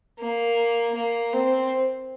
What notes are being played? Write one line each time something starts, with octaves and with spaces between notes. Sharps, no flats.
A#3
A#3
C4